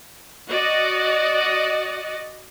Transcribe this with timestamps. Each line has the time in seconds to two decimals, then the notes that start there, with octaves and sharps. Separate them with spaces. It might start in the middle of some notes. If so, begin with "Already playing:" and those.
0.50 F#4 D5 D#5